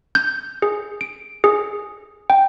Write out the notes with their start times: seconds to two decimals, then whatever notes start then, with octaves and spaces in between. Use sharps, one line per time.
0.15 G6
0.62 G#4
1.01 D7
1.44 G#4
2.30 G5